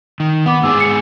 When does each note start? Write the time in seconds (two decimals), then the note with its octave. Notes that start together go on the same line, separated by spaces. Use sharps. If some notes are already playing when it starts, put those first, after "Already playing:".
0.20 D#3
0.46 B3 F#5 D6
0.63 G#2 B3 G#4 E6
0.80 C#7